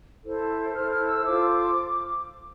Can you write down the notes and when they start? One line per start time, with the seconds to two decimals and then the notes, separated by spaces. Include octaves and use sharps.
0.24 E4 A4 C5
0.73 E4 A4 C5 F6
0.90 F6
1.06 E6
1.23 F4 A4 C5 D6